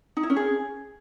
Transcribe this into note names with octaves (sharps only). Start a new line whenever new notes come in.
D#4
E4
C#4
G#4